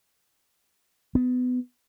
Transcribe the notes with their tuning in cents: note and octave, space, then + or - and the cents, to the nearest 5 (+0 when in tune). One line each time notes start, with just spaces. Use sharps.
B3 +20